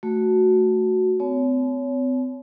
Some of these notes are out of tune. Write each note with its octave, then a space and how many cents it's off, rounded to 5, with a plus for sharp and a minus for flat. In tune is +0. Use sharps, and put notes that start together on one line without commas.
A3 +0 F#4 +0
C4 -40 C#5 +25 A5 -45